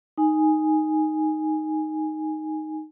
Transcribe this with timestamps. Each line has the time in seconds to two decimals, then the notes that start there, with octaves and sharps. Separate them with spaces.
0.18 D#4 G#5